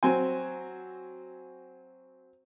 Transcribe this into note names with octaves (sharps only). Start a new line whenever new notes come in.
F#3 C4 G#5